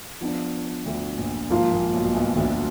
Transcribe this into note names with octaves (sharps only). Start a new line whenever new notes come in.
F3 B3 D4
D2 D3
A#1 A#2
G#1 G#2 F3 A#3 F4
A#1 A#2
B1 B2
B1 B2
D2 D3